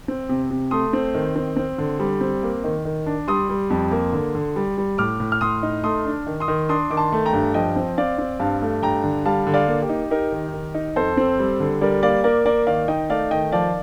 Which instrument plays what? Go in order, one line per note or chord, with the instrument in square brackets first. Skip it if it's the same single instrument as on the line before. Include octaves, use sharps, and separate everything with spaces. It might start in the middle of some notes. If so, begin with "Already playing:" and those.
[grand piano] C4
C3
C3
A3 C6 D#6
C4
D#3
C4
C4
D3
G3
C4
A#3
D#3
D#3
D4
G3 C6 D#6
G3
F2
A#3
D3
D3
G3
G3
A2 D6 F6
A2
F6
A2 C6 D#6
D#4
A3 C6 D#6
D4
D#3
C6 D#6
D#3
D4 C6 D#6
D#3 D6
A5 C6
A3
G5 A#5
G2
F3 D#5 G5
C4
C4 D5 F5
C4
G2 F5 A5
A3
G2 G5 A#5
D3
G3 F5 A5
D3
D5 F5
A#3
G4
D#4
D#4 G4 A#4
D#3
D#3
D#4
F2 A4 C5
C4
G3
D3
G3 A#4 D5
A#3 D5 F5
A#3 A#4 D5
A#3 A#4 D5
D#3 D5 F5
D#4 D#5 G5
A3 D5 F5
D#3 D#5 G5
F3 D5 F5